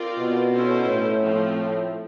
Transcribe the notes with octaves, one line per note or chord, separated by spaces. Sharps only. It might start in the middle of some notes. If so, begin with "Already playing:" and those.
Already playing: C4 F4 A#4 D5
B2
C#4 E4 A4 C5
A2
F3 A3 C4
A2